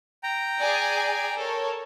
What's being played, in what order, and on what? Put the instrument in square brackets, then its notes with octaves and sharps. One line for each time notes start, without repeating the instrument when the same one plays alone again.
[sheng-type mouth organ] G5 A#5
[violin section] G#4 D5 G#5
A4 A#4 C#5